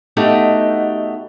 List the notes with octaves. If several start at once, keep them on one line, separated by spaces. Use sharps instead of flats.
B2 A3 D#4 G4 F#5